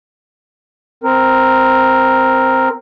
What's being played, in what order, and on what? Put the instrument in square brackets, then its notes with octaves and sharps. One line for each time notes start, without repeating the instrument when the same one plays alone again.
[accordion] C4 A#4